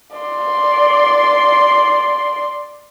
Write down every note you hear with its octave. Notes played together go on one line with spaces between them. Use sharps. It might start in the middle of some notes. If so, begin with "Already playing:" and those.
D5 C6